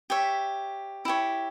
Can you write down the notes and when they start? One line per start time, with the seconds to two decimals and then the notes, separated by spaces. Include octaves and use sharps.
0.10 G4 C#5 E5
1.05 E4 G4 C#5